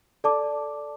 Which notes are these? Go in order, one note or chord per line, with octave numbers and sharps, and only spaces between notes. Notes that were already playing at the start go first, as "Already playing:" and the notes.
A4 D5 A5 D6